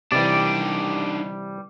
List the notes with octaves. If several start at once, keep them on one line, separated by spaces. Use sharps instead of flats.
C3 D#3 E3 G3 D4 D5